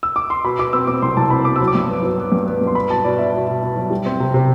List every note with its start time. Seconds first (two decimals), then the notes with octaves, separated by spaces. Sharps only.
0.03 E6
0.16 D6
0.30 C6
0.44 B2 B5
0.59 B2 D6
0.73 C4 E6
0.87 C4 D6
1.02 C2 C6
1.17 C2 A5
1.30 C4 B5
1.45 C4 D6
1.56 F#3 E6
1.67 D6
1.75 G2
1.89 B3
2.03 F#3
2.18 B3
2.32 G2
2.47 B3
2.61 G2
2.67 C6
2.75 B3 B5
2.89 B2 A5
3.04 B2 D5
3.19 B2 E5
3.34 B2
3.48 B2
3.62 B2
3.76 F#3
3.90 G3
4.06 C4
4.20 C3
4.34 C3